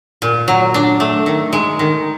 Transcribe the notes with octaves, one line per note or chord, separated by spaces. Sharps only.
A#2
F#3
D4
A3
D#3
G#3
D#3